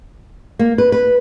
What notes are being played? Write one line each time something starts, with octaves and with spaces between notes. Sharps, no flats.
A#3
B4
B4